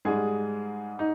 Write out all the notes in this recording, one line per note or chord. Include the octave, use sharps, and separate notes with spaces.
G#2 G3 G#3 G#4
D#4